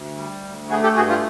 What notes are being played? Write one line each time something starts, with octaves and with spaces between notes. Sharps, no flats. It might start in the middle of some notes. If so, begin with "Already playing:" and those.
Already playing: D2
G3
D2
A3 F#4 G#4
G4 A4
G2 F#4 G#4
F4 G4